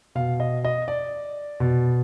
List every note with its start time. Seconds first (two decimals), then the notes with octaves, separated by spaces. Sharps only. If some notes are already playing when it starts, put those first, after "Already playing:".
0.15 B2 F5
0.40 D#5
0.65 D#5
0.88 D5
1.60 B2